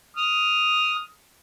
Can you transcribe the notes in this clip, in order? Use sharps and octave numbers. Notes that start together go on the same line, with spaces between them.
D#6 F6